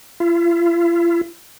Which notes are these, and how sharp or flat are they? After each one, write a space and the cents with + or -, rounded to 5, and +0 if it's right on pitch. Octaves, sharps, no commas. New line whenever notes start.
F4 -45